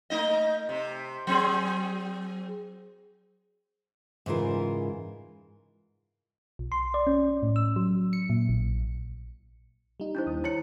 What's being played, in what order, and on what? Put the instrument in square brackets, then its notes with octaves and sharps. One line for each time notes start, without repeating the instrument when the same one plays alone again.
[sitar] A3 D#4 D#5
C3
F#3 C4 G#4
[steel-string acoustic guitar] G#2 C#3 E3 F4 A#4
[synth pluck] B1
C6
D5
C#4
A2
E6
F#3
C#7
A#2
A#1
[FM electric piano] G3 D#4
[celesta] D4 E4 C5
[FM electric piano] D#2 D#6
[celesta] E4 C#5 C#7 [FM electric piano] A#5